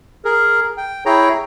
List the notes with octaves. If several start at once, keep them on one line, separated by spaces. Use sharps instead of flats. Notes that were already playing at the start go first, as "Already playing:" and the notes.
G#4 A#4
G5
E4 G#4 C#5 G5 A#5